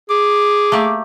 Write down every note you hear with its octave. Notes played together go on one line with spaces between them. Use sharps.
G#4 D6
A3 A#3 G4